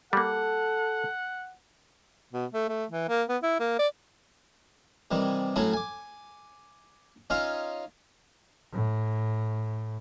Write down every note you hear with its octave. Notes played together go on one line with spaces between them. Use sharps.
G3 A#3 A4 F#5
B2
A3
A3
E3
A#3
B3
E4
A#3
D5
C3 D#3 E3 G3
A2 F#3 A3 C#4 E4
G#5 D6
C#4 D#4 F4 C#5 E5 F5
A2